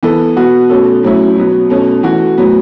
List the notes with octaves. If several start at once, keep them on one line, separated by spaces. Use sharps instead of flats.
E3 B3 A4
B2 B3 F#4
B2 A3 C#4 A4
A2 F#3 C#4 E4
B2 F#3 B3
B2 A3 C#4
E3 A3 F#4
A2 F#3 B3